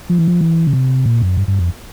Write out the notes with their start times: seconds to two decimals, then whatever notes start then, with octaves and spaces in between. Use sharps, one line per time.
0.09 F3
0.19 E3
0.28 F3
0.41 E3
0.67 C#3
0.73 C3
1.06 A#2
1.22 F#2
1.37 G2
1.48 G2
1.59 F2